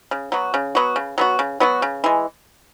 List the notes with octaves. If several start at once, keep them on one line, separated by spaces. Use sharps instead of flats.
C#3
F#3 B3 F#4
C#3
F#3 B3 F#4
C#3
F#3 B3 F#4
C#3
F#3 B3 F#4
C#3
E3 G#3